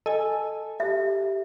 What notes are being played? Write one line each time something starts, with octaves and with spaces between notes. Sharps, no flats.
A4 D#5 G#5
G4 E5